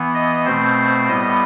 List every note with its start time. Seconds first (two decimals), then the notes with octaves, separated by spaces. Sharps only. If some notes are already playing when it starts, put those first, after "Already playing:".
Already playing: E3 B3
0.14 D#5
0.45 B2 A3 C4 C5
1.08 A2 G3 B3 D#5